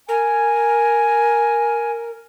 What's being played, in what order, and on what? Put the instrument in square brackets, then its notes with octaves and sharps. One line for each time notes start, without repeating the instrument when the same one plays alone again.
[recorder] A#4 [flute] G#5